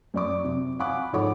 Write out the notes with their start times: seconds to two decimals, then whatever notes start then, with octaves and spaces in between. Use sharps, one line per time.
0.14 F#2 D5 D6
0.44 C3
0.79 F5 F#5 G#5 B5 D6 F#6
1.13 G#2 F3 A4 C#5 F#5 D6